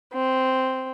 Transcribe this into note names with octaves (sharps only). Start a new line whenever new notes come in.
C4